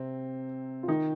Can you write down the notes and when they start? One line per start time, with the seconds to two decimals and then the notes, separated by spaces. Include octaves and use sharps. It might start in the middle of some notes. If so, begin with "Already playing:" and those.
Already playing: C3 C4
0.83 F4
0.88 D#3 D#4